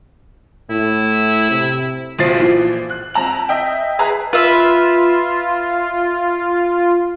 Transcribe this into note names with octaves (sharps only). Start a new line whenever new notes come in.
A2 E4
C3
F#1 B1 F3 C5 A6 C7
A#2 E3 F3
F#6
F2 A5 A#5 F#7
D#5 E5 G5
G#4 B4 A#5 F#6
F4 B4 E5